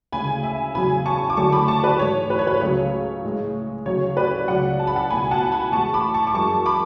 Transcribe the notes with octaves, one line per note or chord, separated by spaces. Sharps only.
D2 C#3 G#3 G#5 B5
E5 G#5
E2 C#3 F#3 G#5 B5
A5 C#6
D6
D2 D3 F#3 A3 A5 C#6
B5 D6
A5 C#6
B4 D5
G#2 E3 A3 C#5
B4
C#5
B4
C#2 C#3 F#3 A3 C#5
A2 G#3
D2 C#3 F#3 C#5
B4 D5
C#2 C#3 F#3 D5 F#5
A5
B5
F#5 A5
C#2 B2 A3 G#5 B5
F#5 A5
G#5 B5
A2 E3 G#3 A5 C#6
B5 D6
A5 C#6
D6
F#2 E3 G#3 A5 C#6
B5 D6